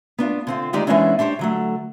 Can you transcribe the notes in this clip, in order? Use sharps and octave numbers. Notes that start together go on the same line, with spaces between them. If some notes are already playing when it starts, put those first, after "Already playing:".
B3 D4 F4
D3 C4 F4
D2 D#3 G#3 D#4 G4 D5
E3 G#3 B3 C#4 D4 E4
D4 G4 C5 C#5
D3 F#3 A3